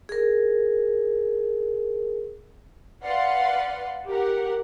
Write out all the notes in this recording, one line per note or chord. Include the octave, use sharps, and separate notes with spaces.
G#4 A#4
B4 D5 F5 F#5 C6
G4 A#4 F#5